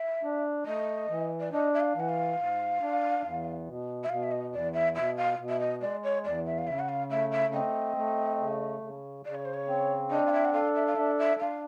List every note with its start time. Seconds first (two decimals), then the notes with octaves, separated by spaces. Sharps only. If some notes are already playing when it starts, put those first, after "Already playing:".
Already playing: E5
0.23 D4
0.66 A3 D#5
1.09 E3
1.40 D5
1.52 D4 D#5
1.74 E5
1.80 F5
1.95 E3 F#5
2.09 F5
2.38 G#2
2.82 D4
3.23 E2
3.67 B2
4.04 E5
4.09 B2 F5
4.23 E5
4.31 D#5
4.53 E2 D5
4.74 E5
4.95 B2 E5
5.17 F5
5.39 B2
5.49 E5
5.60 D#5
5.81 G#3 D5
6.04 C#5
6.25 E2 D5
6.46 E5
6.58 F5
6.67 C#3 E5
6.79 F#5
6.89 F5
7.10 A3 E5
7.31 E5
7.53 C4 D#5
7.97 A3
8.40 C#3
8.82 C#3
9.25 C#3 D5
9.35 C#5
9.45 C5
9.54 C#5
9.68 C4
10.11 D4 D#5
10.26 F5
10.33 E5
10.45 F#5
10.54 A4 F5
10.75 E5
10.86 F5
10.96 D4 E5
11.19 E5
11.40 D4 F5